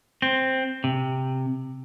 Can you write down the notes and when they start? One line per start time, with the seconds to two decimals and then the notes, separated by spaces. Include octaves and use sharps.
0.22 C4
0.84 C3